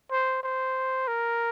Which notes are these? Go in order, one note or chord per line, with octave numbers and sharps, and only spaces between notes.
C5
C5
A#4